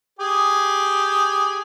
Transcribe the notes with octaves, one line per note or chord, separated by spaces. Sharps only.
G4 G#4